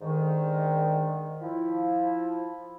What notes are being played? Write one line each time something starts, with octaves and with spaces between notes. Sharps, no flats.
G#2 D3 D#3
F3 E4